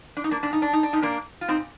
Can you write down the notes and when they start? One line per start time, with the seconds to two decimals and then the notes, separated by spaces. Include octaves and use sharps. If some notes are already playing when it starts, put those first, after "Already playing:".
0.17 D4
0.24 D#4
0.31 A#3 D4
0.43 A#2 D4
0.53 D#4
0.62 D4
0.73 D#4
0.83 D4
0.93 A#2 D#4
1.02 A#3 D4
1.41 F4
1.48 A#2 C4 D#4